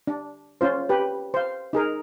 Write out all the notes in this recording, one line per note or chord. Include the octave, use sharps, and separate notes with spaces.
D4
C#4 F4 C5
G4 B4
C5 F5
D#4 G#4 A#4